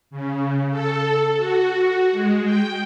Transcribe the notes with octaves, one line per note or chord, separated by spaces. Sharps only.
C#3
A4
F#4
F#4
G#3
G5